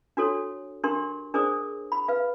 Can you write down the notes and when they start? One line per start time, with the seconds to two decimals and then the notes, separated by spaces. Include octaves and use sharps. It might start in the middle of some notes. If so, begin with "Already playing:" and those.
0.17 D4 F#4 A4 C#5
0.84 D4 G4 A#4 C6
1.34 D4 G#4 A#4 C5 D5 D#6
1.92 B5
2.08 B4 F5